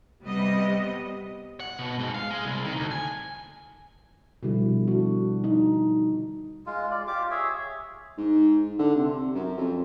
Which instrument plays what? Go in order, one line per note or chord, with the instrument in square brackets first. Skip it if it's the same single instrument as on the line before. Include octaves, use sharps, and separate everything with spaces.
[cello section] C3 G3 B3 D#5
[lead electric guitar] F#5
B2
G#2
F5
G#3
C2
D#3
D2
G#5
[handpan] B2 D3 F3 G3 E4
D4 F#4
D#4
[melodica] G#3 F4
D5
F4 G4 D6
G#4 C#5 E5
[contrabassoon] G#2
D3
C3
F#2
F2